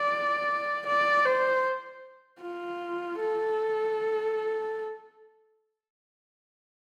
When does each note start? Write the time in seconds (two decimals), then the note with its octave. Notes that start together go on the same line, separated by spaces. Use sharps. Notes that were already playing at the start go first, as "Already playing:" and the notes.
Already playing: D5
0.86 D5
1.25 C5
2.42 F4
3.20 A4